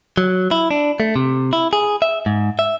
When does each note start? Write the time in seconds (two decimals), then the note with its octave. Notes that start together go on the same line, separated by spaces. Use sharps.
0.17 F#3
0.51 E4
0.71 D4
1.00 A3
1.16 C3
1.53 E4
1.73 G#4
2.02 E5
2.26 G#2
2.59 E5